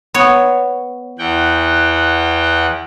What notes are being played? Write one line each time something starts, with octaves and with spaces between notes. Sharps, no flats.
B3 C#5
E2 F#5 G5